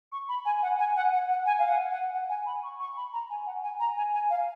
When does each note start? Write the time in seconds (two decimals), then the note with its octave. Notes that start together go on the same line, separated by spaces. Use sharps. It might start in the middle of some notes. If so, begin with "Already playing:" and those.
0.12 C#6
0.29 B5
0.45 G#5
0.62 F#5
0.79 G#5
0.96 F#5
1.13 F#5
1.29 F#5
1.46 G#5
1.59 F5
1.68 F#5
1.91 F#5
2.13 F#5
2.29 G#5
2.46 B5
2.63 C#6
2.80 C#6
2.97 B5
3.13 A#5
3.30 G#5
3.46 F#5
3.63 G#5
3.80 A#5
3.97 G#5
4.14 G#5
4.30 F5